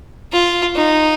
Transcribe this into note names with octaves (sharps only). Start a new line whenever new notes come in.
F4
D#4